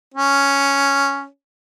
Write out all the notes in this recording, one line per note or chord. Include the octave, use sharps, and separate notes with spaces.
C#4